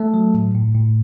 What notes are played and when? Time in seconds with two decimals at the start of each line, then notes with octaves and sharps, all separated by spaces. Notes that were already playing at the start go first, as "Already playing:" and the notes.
Already playing: A3 A4
0.14 F#3
0.34 A2
0.55 A2
0.75 A2